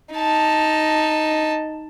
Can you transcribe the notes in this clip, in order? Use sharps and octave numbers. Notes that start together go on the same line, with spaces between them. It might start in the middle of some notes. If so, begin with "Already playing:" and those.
D#4 A5